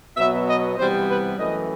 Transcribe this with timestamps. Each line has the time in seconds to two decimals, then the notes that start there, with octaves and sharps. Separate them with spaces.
0.17 B2 F#3 B3 E5
0.47 D#5
0.77 C3 E3 G3 B3 C5
1.08 B4
1.38 F#2 E3 A3 D#5